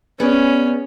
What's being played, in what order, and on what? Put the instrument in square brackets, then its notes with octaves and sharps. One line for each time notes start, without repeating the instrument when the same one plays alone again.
[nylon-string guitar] B3 G#4 D5 [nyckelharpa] C#4